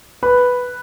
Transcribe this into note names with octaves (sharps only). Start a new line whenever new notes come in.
B4 B5